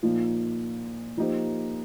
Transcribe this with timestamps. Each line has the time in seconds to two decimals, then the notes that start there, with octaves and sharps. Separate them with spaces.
0.03 A#2 F3 A#3 D#4
1.17 F3 A#3 D#4 G4 C5